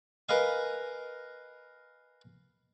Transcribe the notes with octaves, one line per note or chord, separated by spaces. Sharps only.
A#4 B4 D#5 F5 G#5